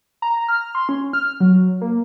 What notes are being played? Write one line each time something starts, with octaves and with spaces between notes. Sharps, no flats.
A#5
F6
C6
C#4
F6
F#3
A#3